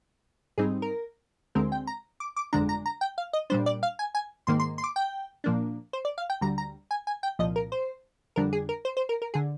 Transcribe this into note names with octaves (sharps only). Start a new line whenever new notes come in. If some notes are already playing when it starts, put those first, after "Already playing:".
G#2 G3 C4 D#4 G#4
A#4
D2 D3 G#3 C4 A#4
G5
A#5
D6
D6
G1 F2 D3 G#3 D4 A#5
A#5
A#5
G5
F5
D#5
A#2 G3 D4 C5
D5
F5
G#5
G#5
G#2 D#3 A#3 C6
C6
C6
D6
G5
A#2 F3 A#3 D4
C5
D5
F5
G5
D2 D3 G3 A#5
A#5
G#5
G#5
G5
C2 A#2 F3 D#5
A#4
C5
F2 D3 G3 D4 A#4
G#4
A#4
C5
C5
A#4
A#4
D3 G#4